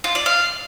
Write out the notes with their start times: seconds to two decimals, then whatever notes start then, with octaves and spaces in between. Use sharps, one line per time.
0.04 F4
0.15 D5
0.26 F5